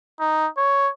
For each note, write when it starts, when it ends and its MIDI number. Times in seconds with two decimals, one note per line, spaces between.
0.20 0.47 63
0.57 0.89 73